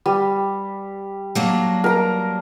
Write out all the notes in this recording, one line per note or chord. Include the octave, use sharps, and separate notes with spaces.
G3
F#3 A#3 D4
A#4 A#5